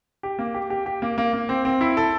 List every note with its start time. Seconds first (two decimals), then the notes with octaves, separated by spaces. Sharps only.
0.23 G4
0.39 A#3
0.54 G4
0.70 G4
0.86 G4
1.02 A#3
1.18 A#3
1.33 A#3
1.49 C4
1.65 C4
1.81 E4
1.97 A4